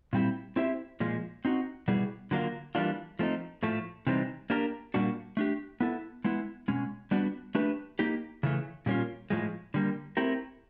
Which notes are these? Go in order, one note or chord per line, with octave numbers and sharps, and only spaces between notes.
A#2 G3 C4 E4 G4
C4 E4 G4 C5 E5
A#2 F3 G#3
C4 D#4 F#4
B2 G3 B3 E4 G#4
D3 F#3 A#3 D4 F4
E3 G3 A#3 D4 F4
F3 A3 C4 D#4
A2 F3 A3
C3 E3 G3 C4 D#4
A#3 D4 G4 A#4
A#2 G3 A#3 D4 F#4
A3 D4 G4
B3 E4 A4
G#3 B3 E4
B2 G#3 C#4
G3 B3 D4 F#4
A3 D4 G4 B4
A#3 D#4 G4
C#3 E3 A3
A#2 G3 A#3 C#4 F4
A2 F3 G#3
D3 G3 A#3
A3 C4 E4 G4 A#4